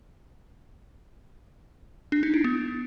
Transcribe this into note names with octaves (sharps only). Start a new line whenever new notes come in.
D4
D#4
E4
B3